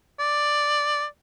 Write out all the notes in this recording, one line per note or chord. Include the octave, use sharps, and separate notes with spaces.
D5